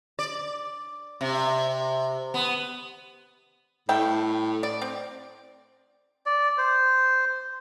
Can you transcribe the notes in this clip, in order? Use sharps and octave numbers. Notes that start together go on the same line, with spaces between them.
D5
C3
B3
A2 G3 E5 G5
D5
C4
D5
C5